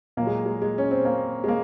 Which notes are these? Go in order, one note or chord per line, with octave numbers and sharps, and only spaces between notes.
A#2 F#3 A#3
G#3
G#3
G#3
C#4
C4
A#3
G#3
A#3